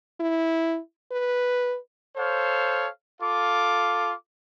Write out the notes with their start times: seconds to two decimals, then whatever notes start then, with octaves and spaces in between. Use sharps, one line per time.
0.20 E4
1.12 B4
2.17 A4 C5 C#5 F5
3.21 F4 A4 F5 D6